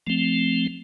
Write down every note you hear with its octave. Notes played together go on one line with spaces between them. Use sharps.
F3 A3 C4